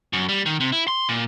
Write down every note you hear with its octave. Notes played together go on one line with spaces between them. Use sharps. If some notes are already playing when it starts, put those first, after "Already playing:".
F#2
G3
D#3
C3
E4
C6
A#2